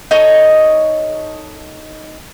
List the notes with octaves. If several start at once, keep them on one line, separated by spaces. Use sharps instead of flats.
D#4 A4 C#5 D#5